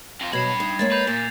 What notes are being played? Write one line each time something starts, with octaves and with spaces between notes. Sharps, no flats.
F2 F4 A#6
G2 B2 F#3 E5 B5 G#6 C7 E7
D#4
G#3 A#3 C#5 A6
B4 G6 E7 F7
A#2 A#3